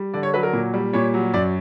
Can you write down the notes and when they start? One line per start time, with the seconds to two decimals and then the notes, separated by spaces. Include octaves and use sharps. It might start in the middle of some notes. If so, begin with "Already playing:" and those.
Already playing: G3
0.14 D3 D5
0.23 C#5
0.34 F#3 B4
0.43 A#4
0.53 A#2
0.74 G3
0.93 A#2 C#5
1.14 F#3
1.34 F#2 D5